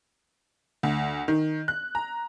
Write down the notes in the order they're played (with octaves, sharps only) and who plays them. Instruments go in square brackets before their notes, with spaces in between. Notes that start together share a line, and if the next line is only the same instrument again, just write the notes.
[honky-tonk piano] D2
D#3
F#6
A#5